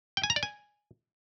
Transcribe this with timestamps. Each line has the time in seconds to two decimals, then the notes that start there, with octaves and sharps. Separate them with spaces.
0.17 G5
0.24 G#5
0.30 A#5
0.36 D5
0.43 G#5